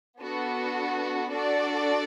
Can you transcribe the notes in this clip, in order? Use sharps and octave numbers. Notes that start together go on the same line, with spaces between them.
B3 D4 F#4 A4
D4 F#4 A4 D5